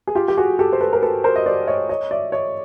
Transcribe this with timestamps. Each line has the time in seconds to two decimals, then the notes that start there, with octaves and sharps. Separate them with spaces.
0.07 G#4
0.15 F4 G4
0.28 G4
0.37 F#4 G#4
0.59 G4 A4
0.73 C5
0.81 A4 B4
0.93 A#4
1.02 A4 B4
1.24 A#4 C5
1.36 D#5
1.46 C5 D5
1.67 C#5 D#5
1.89 C#5 D#5
2.11 D5 E5
2.32 C#5 D#5